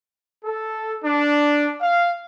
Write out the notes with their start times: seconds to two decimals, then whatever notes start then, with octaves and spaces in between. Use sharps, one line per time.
0.45 A4
1.05 D4
1.81 F5